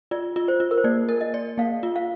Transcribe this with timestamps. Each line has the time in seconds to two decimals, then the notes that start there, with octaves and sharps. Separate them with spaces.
0.11 F4 D5
0.36 F4
0.48 C5
0.60 F4
0.71 A#4
0.78 C5
0.84 A#3 D5
1.09 A#4
1.21 D#5
1.34 D5
1.58 A#3 F5
1.83 F4
1.96 F5